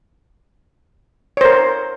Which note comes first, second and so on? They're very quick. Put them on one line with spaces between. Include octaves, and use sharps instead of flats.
C#5 C5 A#4